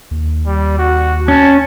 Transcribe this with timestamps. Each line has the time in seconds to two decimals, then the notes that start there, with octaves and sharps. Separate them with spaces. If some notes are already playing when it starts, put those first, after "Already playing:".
0.11 D#2
0.46 G3
0.78 F#4
1.28 C#4 A5